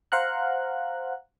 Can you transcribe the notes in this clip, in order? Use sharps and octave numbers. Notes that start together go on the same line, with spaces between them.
C5 F5 F#5 A#5 F#6